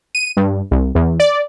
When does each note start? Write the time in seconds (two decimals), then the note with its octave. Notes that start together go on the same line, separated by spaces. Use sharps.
0.15 D#7
0.37 G2
0.71 C2
0.95 E2
1.20 D5